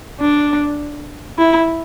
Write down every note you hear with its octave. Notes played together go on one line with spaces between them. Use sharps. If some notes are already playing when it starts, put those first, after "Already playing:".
D4
E4